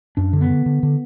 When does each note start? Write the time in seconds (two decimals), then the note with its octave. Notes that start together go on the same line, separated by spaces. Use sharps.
0.17 F#2 D4
0.33 D3
0.41 B3
0.50 D3
0.66 D3
0.83 D3